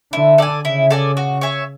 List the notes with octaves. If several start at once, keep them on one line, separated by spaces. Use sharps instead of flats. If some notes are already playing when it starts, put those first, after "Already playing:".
D3 E4
A4 D5 G#5
C#3 E4
A4 D5 G#5
F#4
C#5 E5 G#5